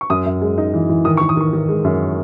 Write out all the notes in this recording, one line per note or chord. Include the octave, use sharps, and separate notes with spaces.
C#6
F#2 D#6
F#2
G#3
D#4
E3
E3
D#3 D#6
C#6
D#3
D#6
D#3 C#6
D#3
G#3
F#2